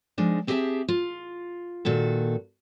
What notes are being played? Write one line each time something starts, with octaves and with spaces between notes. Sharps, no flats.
F3 G#3 D4 D#4
C4 G4 G#4 C#5 E5 A5
F4
A#2 D#3 F#4 A4